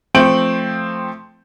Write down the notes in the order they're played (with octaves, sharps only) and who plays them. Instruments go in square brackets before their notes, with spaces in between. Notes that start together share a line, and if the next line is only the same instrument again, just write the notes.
[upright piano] F3 A3 C4 G6 D7 F#7